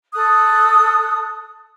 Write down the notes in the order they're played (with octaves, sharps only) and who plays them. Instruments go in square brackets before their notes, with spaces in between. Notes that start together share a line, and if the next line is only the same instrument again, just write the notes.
[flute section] A4 D#6 F#6